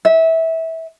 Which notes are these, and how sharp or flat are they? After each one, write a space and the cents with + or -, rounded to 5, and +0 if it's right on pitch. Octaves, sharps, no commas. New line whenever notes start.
E5 -20